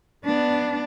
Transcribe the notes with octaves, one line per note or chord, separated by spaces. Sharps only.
B3 D4